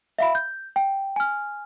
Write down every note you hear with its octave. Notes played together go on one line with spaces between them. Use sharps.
E5 F5 B5
G6
G5
G#5 F6